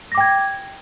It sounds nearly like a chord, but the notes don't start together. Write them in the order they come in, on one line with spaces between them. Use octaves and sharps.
A#6 D6 G5 G#6